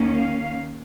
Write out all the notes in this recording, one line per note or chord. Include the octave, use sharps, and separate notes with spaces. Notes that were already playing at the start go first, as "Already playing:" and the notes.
Already playing: D#2 D#3 A#3 C#4
F5